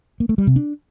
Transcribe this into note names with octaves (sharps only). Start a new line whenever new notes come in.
A#3
A3
G3
C3
D4